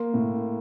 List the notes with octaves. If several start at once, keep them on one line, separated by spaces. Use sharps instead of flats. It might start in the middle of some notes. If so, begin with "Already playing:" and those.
Already playing: A#3 C6
A2